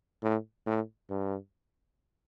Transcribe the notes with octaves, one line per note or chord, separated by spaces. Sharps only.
A2
A2
G2